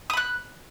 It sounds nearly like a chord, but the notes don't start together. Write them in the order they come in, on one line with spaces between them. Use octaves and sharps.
D#6 B5 F#6